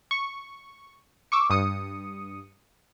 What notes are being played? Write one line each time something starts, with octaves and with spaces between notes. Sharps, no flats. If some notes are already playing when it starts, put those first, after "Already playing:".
C#6
C#6 D6 E6
G2 D#6 C#7